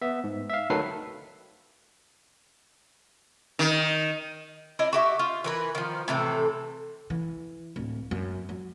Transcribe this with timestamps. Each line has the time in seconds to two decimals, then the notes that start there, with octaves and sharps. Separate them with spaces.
0.02 B3 E5
0.24 G#2
0.50 E5 F5
0.70 D2 D#3 F#3 A4 B4 C7
3.59 D#3
4.79 D4 E4 D#5
4.93 F#4 G4 E5
5.19 F4
5.44 E3 A#4 B4
5.75 D#3 F3
6.08 A2 C3 E3 A4
7.10 E3
7.76 D1
8.11 F#2
8.49 F#3